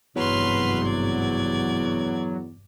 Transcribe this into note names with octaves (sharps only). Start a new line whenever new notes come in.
G#1 E2 G2 C3 F#3 B4 C6 F6
D5 G#6